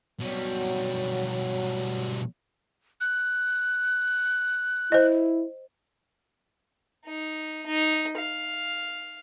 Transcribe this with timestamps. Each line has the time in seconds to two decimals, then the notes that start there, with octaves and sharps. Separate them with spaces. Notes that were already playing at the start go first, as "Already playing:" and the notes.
0.20 B2 F#3 G3
3.01 F#6
4.92 E4 C5 D#5
7.06 D#4
7.66 D#4
8.17 F5